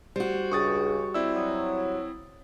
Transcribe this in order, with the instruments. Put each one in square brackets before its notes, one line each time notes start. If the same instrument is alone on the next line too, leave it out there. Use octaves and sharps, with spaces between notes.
[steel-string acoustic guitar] G3 F#4 [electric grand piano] C5
[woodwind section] C#2 [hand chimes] D4 G#4 [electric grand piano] C#6 D#6 A6
[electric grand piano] C4 E4 E6 [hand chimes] D5
[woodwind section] F#3 [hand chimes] D#6